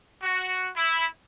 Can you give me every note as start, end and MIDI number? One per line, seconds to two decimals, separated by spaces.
0.23 0.68 66
0.76 1.07 64